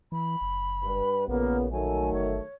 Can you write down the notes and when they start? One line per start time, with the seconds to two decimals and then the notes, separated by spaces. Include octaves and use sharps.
0.12 E3 B5
0.41 F#1
0.83 G2 B4
1.28 A#1 A#2 C#3 A#3 B3
1.71 D#3 F#3 A3 G#5
2.13 G1 C#5